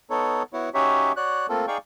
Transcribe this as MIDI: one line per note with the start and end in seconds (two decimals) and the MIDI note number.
0.10 0.43 59
0.10 0.43 63
0.10 0.43 69
0.10 0.43 73
0.53 0.69 59
0.53 0.69 64
0.53 0.69 66
0.53 0.69 73
0.74 1.12 61
0.74 1.12 63
0.74 1.12 66
0.74 1.12 67
0.74 1.12 73
0.74 1.12 76
1.16 1.47 66
1.16 1.47 73
1.16 1.47 74
1.16 1.47 90
1.49 1.66 57
1.49 1.66 58
1.49 1.66 60
1.49 1.66 65
1.49 1.66 69
1.67 1.78 63
1.67 1.78 68
1.67 1.78 74
1.67 1.78 77
1.67 1.78 79
1.67 1.78 85